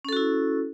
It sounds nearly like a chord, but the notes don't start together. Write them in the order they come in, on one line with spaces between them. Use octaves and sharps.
C#4 A4 F#4 E4